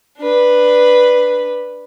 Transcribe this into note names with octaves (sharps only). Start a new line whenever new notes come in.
D4 B4